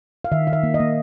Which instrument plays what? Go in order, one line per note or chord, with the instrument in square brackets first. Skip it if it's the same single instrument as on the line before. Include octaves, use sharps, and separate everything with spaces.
[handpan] F5
D#3 E5
D#3 F5
E5
A#3
D#5
A#3